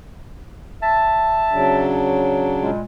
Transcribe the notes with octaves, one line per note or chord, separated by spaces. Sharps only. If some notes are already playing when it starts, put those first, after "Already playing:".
E5 A5
C#3 F#3 D4
A#2 G3 G#3